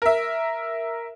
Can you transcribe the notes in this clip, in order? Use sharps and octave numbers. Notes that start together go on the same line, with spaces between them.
A#4 E5